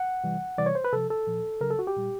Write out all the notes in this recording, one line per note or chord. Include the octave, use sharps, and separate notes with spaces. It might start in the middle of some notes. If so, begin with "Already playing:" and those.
Already playing: F#5
C3 E3 G3
C3 E3 G3 D5
C#5
C5
B4
C3 F3 A4
A4
A#2 F3
C#3 F#3 A#4
A4
F#4
G4
A#2 G3